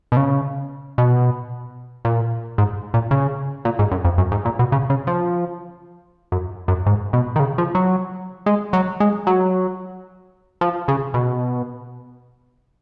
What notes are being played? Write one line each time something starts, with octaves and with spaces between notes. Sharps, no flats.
B2
C#3
B2
A#2
G#2
A#2
C#3
A#2
G#2
F#2
F2
F#2
G#2
A#2
B2
C#3
C#3
F3
F#2
F#2
G#2
B2
D#3
C#3
F3
F#3
G#3
F#3
G#3
F#3
F3
C#3
B2